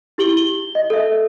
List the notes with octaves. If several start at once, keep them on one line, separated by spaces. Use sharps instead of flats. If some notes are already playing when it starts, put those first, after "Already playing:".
E4 G4 F#7 G7
G7
D#5
A4 E5